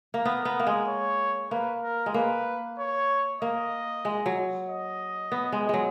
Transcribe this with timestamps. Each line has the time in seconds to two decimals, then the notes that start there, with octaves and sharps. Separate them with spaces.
0.14 A#3
0.24 B3 A#4
0.45 B3
0.60 A#3
0.67 G#3
0.88 C#5
1.51 A#3 B4
1.83 A#4
2.06 G#3
2.14 A#3 B4
2.79 C#5
3.41 A#3 D#5
4.05 G#3
4.26 F#3
4.68 D#5
5.32 B3
5.52 G#3
5.69 F#3 G#3